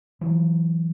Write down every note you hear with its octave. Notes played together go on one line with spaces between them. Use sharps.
E3 F#3